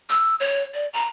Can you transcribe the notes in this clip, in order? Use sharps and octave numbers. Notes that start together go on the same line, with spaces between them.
E6
C#5
D5
A#5